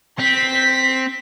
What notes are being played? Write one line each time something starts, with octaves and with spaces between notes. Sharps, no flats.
C4 B6